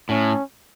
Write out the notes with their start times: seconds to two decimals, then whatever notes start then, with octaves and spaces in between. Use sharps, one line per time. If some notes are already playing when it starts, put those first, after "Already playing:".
0.09 A2 C#4